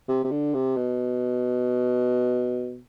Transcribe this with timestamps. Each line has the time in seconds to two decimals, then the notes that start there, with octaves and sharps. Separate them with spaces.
0.08 C3
0.24 C3
0.31 D3
0.54 C3
0.76 B2